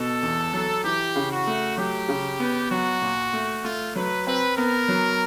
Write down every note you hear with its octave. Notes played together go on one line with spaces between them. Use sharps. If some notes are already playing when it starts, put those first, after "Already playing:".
Already playing: B2 A4
E2
F#3
E3 G4
C#3
F#4
A3
F#3 G4
C#3
B3
F#3 F#4
A#2
A3
A3 F4
F#3 B4
C4 B4
B3 A#4
F#3